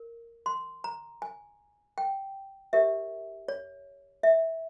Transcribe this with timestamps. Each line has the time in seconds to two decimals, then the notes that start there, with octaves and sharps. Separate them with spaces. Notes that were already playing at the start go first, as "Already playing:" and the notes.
Already playing: A#4
0.46 C6
0.84 A#5
1.22 G#5
1.98 G5
2.73 G4 A#4 C#5 E5
3.48 C#5
4.23 E5